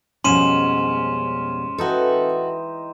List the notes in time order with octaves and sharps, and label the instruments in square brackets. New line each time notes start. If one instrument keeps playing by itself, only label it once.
[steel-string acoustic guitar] F2 B2 G3 [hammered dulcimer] G#2 [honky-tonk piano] C#4 [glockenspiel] C6 D#7 E7
[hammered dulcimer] E3 D#4 G5 [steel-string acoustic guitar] F#4 A4